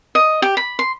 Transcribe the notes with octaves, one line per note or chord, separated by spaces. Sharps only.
D#5
G4
B5
C6